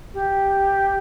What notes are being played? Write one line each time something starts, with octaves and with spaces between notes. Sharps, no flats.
G4